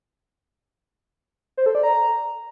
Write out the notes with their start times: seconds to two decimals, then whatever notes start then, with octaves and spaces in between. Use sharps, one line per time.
1.58 C5
1.66 A4
1.75 D5
1.83 A#5